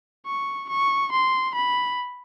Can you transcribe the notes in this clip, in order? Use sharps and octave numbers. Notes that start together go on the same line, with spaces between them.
C#6
C#6
C6
B5